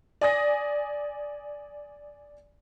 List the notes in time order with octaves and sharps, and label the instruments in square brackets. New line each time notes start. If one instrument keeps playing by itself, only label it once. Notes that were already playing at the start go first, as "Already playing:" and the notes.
[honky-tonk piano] D5 G#5 D#6 A#6